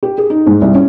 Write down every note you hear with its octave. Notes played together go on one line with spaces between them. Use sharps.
G4
G#4
D#4
G#2
C2
C#4